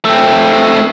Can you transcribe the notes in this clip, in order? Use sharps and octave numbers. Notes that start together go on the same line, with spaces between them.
A3 C4